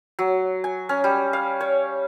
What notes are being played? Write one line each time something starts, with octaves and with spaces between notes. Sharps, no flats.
F#3
G#5
C#4
G3
F5
C#5